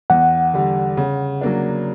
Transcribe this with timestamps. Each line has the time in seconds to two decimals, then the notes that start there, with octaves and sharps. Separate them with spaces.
0.10 E2 F#5
0.54 D3 G3
0.97 C#3
1.41 F#3 A#3 D4